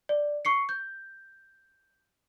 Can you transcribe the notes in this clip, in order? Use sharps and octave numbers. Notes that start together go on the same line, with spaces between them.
D5
C#6 C7 C#7
G6